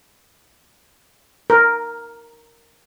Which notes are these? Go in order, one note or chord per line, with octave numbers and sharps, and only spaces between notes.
A#4